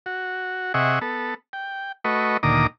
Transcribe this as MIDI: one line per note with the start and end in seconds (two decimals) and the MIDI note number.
0.06 0.73 66
0.74 0.99 48
0.74 0.99 68
0.74 0.99 75
0.74 0.99 76
0.74 0.99 78
0.74 0.99 85
1.02 1.34 59
1.02 1.34 69
1.53 1.92 79
2.05 2.37 57
2.05 2.37 66
2.05 2.37 71
2.05 2.37 75
2.05 2.37 85
2.43 2.67 38
2.43 2.67 46
2.43 2.67 51
2.43 2.67 82
2.43 2.67 86
2.43 2.67 87